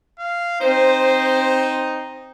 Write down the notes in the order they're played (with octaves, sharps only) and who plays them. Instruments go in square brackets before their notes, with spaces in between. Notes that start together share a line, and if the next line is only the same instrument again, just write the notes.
[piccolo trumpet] F5
[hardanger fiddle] C4 [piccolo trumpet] D#4 [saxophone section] C5